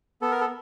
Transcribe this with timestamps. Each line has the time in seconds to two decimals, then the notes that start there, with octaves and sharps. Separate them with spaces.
0.22 B3 A4
0.31 A#4
0.40 A4